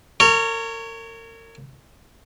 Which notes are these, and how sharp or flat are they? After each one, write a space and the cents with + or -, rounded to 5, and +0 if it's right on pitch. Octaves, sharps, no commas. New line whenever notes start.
A#4 -35 C#5 +0